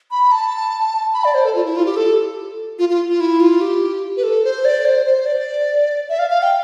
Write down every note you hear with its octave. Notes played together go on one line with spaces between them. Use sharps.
B5
A5
B5
D5
C5
A4
F4
E4
F4
G4
A4
F4
F4
F4
E4
F4
G4
B4
A4
C5
D5
C5
C5
D5
E5
F5
F5
G5